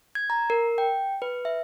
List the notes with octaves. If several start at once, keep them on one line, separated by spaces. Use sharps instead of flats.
G#6
A#5
A#4
G5
B4
E5